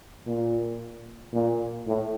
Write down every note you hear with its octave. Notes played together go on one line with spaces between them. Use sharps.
A#2
A#2
A2